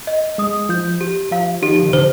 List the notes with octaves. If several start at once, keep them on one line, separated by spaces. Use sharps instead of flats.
D#5
G#3 D#6
F3 G6
G4
F3 F5
D#3 G4
F3
D#3
C3
D3 C5